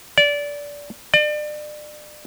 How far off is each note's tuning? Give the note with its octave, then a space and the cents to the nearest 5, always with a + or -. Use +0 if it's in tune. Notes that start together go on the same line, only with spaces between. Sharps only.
D5 -20
D5 +35